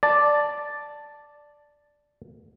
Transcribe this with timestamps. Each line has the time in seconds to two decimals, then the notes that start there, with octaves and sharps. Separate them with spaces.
0.03 D5 A5